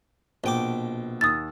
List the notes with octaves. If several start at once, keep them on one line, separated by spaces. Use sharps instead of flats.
A#1 B2 G5 D6
D#2 D#6 E6 A6